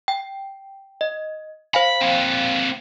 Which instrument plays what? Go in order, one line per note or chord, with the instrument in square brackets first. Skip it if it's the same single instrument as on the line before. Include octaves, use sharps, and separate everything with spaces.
[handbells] G5
D#5
[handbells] C5 F5 G#5 [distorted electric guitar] B5
[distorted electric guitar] A#3 C4